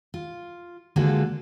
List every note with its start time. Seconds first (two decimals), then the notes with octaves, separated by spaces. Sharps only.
0.14 F4
0.96 D3 G#3 A#3 F4 F#4 A4